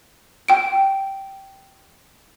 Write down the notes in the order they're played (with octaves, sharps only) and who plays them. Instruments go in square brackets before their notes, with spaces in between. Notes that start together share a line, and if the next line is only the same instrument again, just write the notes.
[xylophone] G5 D7